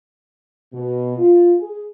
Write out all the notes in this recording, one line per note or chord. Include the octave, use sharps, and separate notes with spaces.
B2
F4
G#4